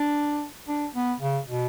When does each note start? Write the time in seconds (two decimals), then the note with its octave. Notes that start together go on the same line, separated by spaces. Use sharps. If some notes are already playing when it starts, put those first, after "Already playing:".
Already playing: D4
0.68 D4
0.95 B3
1.20 C#3
1.48 B2